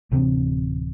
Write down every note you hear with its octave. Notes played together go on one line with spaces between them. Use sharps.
D1 C3 E3 C4